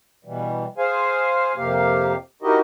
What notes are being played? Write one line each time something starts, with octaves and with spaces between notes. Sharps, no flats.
B2 E3 G3
G#4 C5 F5 G#5
F2 C3 A#3 G4 F5
D#4 E4 F#4 G4 A#4 D#5